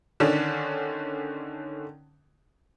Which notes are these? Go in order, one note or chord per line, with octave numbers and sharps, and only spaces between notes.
D3 D#3 C#4 D4